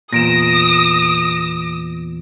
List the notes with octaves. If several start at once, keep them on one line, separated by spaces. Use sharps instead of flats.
E2 A#2 D#6 A#6 D7 E7